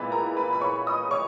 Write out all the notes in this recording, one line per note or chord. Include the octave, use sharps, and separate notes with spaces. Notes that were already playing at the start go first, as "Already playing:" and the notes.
Already playing: A#2 G#3 B3 E4 B4 B5
A#4 A#5
B4 B5
B5
C#5 C#6
D#5 D#6
C#5 C#6